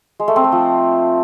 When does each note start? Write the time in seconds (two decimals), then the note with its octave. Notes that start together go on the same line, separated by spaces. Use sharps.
0.20 G#3
0.28 A3
0.36 C4
0.44 A3
0.52 F3